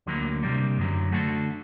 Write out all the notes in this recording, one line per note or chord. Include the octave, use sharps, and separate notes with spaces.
D2 D3 F#3 A#3
C3 G3 A#3 D4
F#2 D3 F#3
D3 A3 D4 F#4 A4